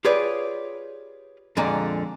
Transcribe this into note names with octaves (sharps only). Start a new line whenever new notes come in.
F4 G4 G#4 B4 C#5 D5
F2 A#2 D3 G#3 G#5 A#5